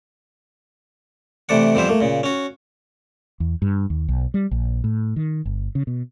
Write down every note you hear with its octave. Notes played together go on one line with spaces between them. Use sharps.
C3 E3 A3 D5 F#5
F2 E3 G3 B3 C5 E5
A3 A#3
A#2 C#3
C#4 F#4
E2
G2
D#2
B1
G3
A#1
A2
D#3
G1
C#3
B2